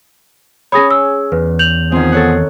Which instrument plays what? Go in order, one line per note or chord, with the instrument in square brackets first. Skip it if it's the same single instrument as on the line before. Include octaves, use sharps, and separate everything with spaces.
[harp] C#4 G#4 C#5 [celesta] B5 D#6 A#6
[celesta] E6
[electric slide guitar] E2 [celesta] B4
[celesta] G6 F7 F#7
[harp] D#3 C4 [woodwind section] F3 B3 G#4
[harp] A4 C#5 F#5